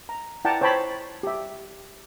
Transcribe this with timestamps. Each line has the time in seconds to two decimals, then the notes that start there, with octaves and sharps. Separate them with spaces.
0.09 A#5
0.45 E4 D5 F#5 G5 A5 A#5
0.61 C5 C#5 G5 A5 B5
1.23 G4 E5